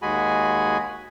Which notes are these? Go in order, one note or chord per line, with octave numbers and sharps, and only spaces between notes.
D#2 G#3 F#4 G#4 G#5 B5